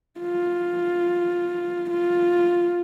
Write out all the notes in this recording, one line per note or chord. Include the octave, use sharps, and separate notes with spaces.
F4
F4